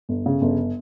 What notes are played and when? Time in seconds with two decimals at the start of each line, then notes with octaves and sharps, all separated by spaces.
0.09 G1
0.26 C#3
0.42 G1